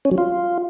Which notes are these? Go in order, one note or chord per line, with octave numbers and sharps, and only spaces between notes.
C#4
F#3
F4